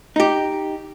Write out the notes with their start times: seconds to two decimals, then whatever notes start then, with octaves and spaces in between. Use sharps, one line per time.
0.16 D#4 G4